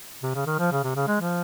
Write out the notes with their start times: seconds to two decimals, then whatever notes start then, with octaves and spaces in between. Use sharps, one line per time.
0.23 C3
0.35 C#3
0.46 D#3
0.59 F3
0.72 C#3
0.84 C3
0.96 C#3
1.07 G#3
1.21 F3